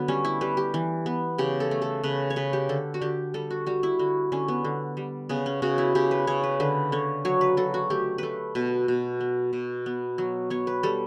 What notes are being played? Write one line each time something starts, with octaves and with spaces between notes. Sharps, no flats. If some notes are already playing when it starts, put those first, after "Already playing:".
Already playing: D3 F#3 B3
G3 C#4
E4
G3 B4
G4
E3
B3
C#3 G4
A4
A3
A4
C#3 B4
C#5
C#3 B4
G4
D3 A4
F#4
D3 G4
G3 A4
F#4
G3 F#4
E4
D3 F#4
D3 C#4
B3
D3
G3
C#3 B3
C#4
C#3 F#4
E4
C#3 G4
B4
C#3 C#5
B4
D3 B4
D3 C#5
F#3 C#5
B4
F#3 A4
F#4
A3 G4
A3 A4 B4
B2 B4
B2
B3
B2
B3
F#3
B3 C#5
B4
G3 A4